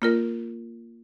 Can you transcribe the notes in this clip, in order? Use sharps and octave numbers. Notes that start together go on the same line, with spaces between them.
A#3 F4 A#4